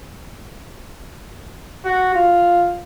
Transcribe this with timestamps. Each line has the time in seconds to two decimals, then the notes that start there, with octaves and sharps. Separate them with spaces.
1.85 F#4
2.14 F4